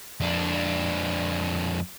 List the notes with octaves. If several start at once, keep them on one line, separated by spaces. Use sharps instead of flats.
F2 D4